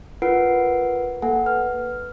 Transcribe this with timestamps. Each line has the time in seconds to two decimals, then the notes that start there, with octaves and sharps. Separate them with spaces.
0.22 F4 A#4 B4 F#5 C7 D7
1.22 A#3 A4 F#5 G#5
1.46 B4 F6